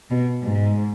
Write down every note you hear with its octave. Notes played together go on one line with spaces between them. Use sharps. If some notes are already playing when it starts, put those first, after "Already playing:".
B2
G#2